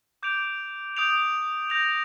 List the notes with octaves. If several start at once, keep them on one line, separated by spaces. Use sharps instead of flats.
D6 G6 D7 F7
D#6 G6 D7 F7
G6 A#6 F7